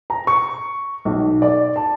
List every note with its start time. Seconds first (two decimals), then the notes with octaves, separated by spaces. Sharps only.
0.10 A#5
0.27 C#6
1.05 B1
1.42 D5
1.76 A5